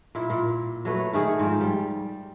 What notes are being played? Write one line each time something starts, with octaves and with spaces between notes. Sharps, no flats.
A#2 E4
A#2
F#3 A3 B4
D#3 A3 G#4
G#2 F3
G3